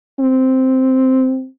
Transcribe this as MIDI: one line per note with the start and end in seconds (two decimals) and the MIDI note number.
0.20 1.47 60